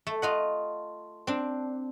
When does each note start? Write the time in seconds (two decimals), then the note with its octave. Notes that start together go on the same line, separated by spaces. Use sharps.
0.07 A3
0.22 F4 D#5 F#5
1.27 C4 D4